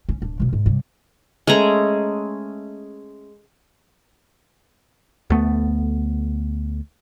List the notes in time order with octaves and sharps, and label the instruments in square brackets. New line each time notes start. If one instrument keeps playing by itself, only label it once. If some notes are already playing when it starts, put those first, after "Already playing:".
[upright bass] C#4
D1 D4
B2 F3
G#2
G2 C3
[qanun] G#3 A3 C#4 A#5
[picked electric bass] D2 A3 B3